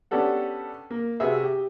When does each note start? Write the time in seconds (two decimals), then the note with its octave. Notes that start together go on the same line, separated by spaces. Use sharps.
0.11 B3 C#4 D4 G4 A4 F#5
0.91 A#3
1.20 C3 F#4 G#4 B4 E5
1.43 G4